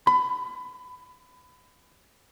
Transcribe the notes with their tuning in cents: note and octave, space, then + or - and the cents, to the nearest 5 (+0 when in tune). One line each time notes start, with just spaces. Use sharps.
B5 +25